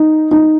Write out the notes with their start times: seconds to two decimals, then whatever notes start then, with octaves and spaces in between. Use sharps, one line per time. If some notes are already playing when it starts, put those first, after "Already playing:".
Already playing: D#4
0.31 D#4